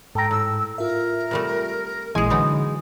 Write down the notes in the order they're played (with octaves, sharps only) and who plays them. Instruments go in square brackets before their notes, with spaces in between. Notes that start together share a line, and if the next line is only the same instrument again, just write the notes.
[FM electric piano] G#2 [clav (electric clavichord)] A4 A#5 [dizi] G5
[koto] A2 [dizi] E6
[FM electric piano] F4 E5 [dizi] A#4
[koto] C3 G3 A3
[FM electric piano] A1 A#2 E3 [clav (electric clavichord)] G#3 [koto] G#4 G#5 [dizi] D#6
[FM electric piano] D3 [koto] E3 F#3 D#4